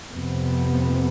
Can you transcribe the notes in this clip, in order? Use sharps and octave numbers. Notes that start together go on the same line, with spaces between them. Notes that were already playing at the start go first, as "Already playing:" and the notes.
F2 C3 B3